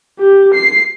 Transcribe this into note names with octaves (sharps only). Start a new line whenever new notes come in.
G4
C7